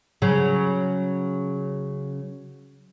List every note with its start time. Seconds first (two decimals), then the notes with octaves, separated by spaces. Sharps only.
0.22 C#3 F#3